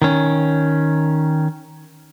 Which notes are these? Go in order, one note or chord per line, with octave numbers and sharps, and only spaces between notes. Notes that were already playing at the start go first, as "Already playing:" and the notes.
D#3 C#4